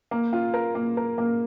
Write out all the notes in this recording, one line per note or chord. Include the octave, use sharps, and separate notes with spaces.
A#3
F4
A#4
A#3
A#4
A#3